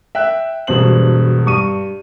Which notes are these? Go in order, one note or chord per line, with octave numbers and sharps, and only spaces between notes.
E5 G5 F#6
E1 G2 B2 C5 F#7
G2 C#6 D#7